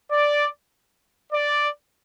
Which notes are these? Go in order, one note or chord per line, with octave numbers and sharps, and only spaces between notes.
D5
D5